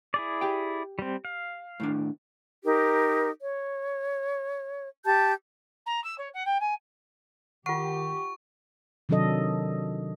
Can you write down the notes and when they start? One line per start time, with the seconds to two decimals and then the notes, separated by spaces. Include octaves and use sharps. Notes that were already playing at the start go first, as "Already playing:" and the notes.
0.14 E4 G#4 D5
0.41 G4 G5
0.99 G3 C4
1.25 F5
1.80 A2 D#3 D4
2.65 D#4 G4 A#4
3.41 C#5
5.05 G4 A5 G6
5.86 A#5
6.04 E6
6.18 C#5
6.34 F#5
6.45 G5
6.60 G#5
7.66 D#3 F4 G4 F#5 C#6
9.09 C3 D#3 F#3 D4 A4 D#5